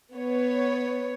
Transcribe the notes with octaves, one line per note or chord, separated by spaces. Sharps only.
B3 C#5